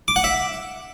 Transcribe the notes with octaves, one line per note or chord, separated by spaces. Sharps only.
D6
F#5
E5